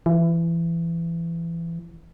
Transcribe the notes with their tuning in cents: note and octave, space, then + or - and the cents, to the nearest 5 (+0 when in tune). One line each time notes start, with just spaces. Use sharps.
E3 +25